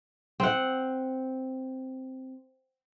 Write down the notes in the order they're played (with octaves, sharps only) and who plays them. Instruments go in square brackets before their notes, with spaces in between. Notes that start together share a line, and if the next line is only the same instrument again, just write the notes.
[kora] C4 F#5